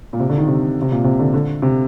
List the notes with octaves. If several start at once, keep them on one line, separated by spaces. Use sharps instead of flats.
A#2
C3
D3
D#3
C3
C3
A#2
C3
D3
D3
C3